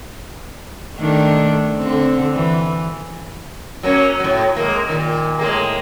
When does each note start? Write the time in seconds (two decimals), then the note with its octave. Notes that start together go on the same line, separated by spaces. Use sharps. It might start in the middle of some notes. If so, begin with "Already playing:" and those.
0.97 D#3 A3 D4
1.79 D3 C4
2.34 E3
3.83 F#3 A#3 C#4
4.20 A2 F#3
4.56 G#3 A#3
4.89 A#2 D#3
5.39 A2 G#3 A#3